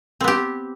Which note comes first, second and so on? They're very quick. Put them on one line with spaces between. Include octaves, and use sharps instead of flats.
C4 B3 G4